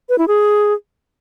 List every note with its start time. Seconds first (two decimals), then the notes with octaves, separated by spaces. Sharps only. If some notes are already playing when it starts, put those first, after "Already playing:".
0.09 B4
0.18 E4
0.28 G#4